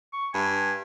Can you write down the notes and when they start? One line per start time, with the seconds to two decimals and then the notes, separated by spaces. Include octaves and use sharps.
0.14 C#6
0.34 G2 G#5